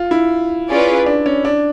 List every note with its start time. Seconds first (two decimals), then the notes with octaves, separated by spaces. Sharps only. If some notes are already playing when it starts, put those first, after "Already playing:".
Already playing: F4
0.11 E4
0.68 C#4 F4 G#4 B4 D5
1.06 D4
1.26 C#4
1.45 D4